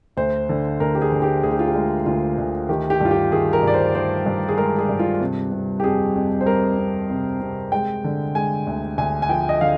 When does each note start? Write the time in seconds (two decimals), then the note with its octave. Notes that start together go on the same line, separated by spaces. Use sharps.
0.17 D2 C5
0.49 D3
0.80 D2 A#4
0.95 G4
1.02 G#4
1.12 D3
1.22 G4
1.43 D2 G#4
1.51 G4
1.59 F4
1.68 G4
1.75 G#3
2.06 D2 F4
2.38 D2
2.69 D#3 G4
2.90 G4
3.01 G2 F4
3.11 G4
3.32 D#3 G#4
3.53 A#4
3.63 G2 D5
3.74 C5
3.95 D#3 C5
4.26 G2
4.48 G#4
4.58 G#3 A#4
4.79 G#4
4.89 G2
4.99 F4
5.21 C3
5.52 C3
5.80 G4
5.84 F2 G#4
6.15 F2
6.41 C5
6.46 G3 A#4
6.78 F2
7.10 C3
7.41 C3
7.72 G#3 G5
8.04 D3
8.35 G#3 G#5
8.67 D2
8.98 D2 G#5
9.22 G#5
9.29 F3 G5
9.49 D#5
9.61 D3 F5